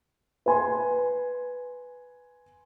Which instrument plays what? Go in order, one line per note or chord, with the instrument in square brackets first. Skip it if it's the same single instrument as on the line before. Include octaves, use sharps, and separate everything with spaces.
[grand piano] B4 G#5 C6